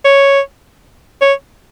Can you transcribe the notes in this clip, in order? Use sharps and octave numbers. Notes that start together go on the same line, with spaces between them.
C#5
C#5